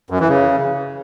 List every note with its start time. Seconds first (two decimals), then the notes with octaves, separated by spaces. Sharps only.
0.10 F#2
0.20 E3
0.29 C#3